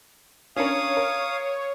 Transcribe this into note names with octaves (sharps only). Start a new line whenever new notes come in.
C#4 D4 A#4 C#5 F5 D#6
A#4